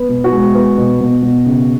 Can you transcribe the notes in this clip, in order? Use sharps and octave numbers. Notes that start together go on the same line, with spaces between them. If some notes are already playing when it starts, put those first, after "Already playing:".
Already playing: B3
B2
F#4
G#3
B3
B2
B2
B2
C#3